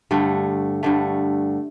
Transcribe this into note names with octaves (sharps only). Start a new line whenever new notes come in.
G2 D3 A3
G2 D3 A3